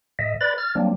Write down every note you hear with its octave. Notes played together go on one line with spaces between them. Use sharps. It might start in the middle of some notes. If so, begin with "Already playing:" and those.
A2 D#5 E5
B4 D5 B5 A6
F6 A6
F#3 G3 A#3 C4 D4